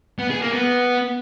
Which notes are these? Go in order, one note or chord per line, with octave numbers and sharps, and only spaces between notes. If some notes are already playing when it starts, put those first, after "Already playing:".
B3
G#4
A#3
B3